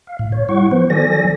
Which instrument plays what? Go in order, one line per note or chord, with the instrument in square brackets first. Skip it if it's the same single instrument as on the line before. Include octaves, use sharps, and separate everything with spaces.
[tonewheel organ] F5
A2
C#5
G3 E4 F#5 C#6
F3 B3 B4 C5
D#3 F#3 A4 D5 G#5 A#6